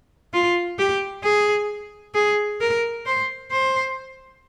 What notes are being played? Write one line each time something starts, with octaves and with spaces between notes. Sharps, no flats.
F4
G4
G#4
G#4
A#4
C5
C5